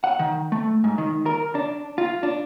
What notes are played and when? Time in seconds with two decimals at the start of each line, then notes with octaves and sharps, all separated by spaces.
0.04 F#5
0.19 D#3
0.52 A3
0.84 G#2
0.98 D#3
1.26 A#4
1.55 D4
1.98 F4
2.23 D4